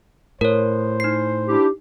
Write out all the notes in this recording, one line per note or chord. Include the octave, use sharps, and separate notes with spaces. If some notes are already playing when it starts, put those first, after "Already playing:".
A2 A#4 C5 C#5
D#4 C7
D4 E4 G4